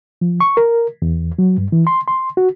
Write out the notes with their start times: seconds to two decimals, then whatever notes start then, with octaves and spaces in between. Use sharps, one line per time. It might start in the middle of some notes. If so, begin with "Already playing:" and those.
0.21 F3
0.41 C#6
0.57 A#4
1.02 E2
1.39 F#3
1.58 G2
1.72 E3
1.87 C6
2.08 C6
2.37 F#4